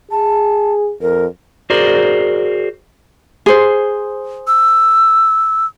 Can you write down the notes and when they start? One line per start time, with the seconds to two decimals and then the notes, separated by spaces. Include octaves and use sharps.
0.11 G#4 A5
1.01 F2 A#4
1.70 F#4 G#4 A#4 C5 D5
3.46 G#4 C5
4.47 E6